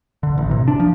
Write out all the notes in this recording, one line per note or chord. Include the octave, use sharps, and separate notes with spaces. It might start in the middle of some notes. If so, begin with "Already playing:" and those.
D3
A1
C3
D4
F3